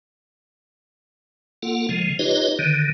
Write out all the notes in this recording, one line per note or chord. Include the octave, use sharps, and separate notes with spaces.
A#3 F4 A4 F#5
C#3 F3 G#3
D#4 F4 G4 B4 C#5 D#5
D3 D#3